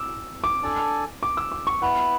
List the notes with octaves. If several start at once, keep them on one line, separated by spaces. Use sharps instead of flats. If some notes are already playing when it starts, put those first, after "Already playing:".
Already playing: D6 E6
D6
D4 A4 D5 G#5
D6
E6
D6
C#6
B3 E4 B4 F#5